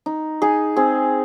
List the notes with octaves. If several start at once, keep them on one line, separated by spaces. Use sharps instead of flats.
D#4
D#4 G#4
C4 G#4